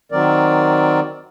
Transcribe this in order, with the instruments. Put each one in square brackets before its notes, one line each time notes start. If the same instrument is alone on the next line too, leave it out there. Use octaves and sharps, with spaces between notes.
[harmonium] D#3 F#3 C4 A#4 D5